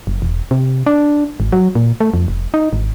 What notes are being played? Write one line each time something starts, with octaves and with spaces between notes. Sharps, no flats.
F#1
E1
C3
D4
G#1
F#3
A#2
A3
F2
F1
D#4
G#1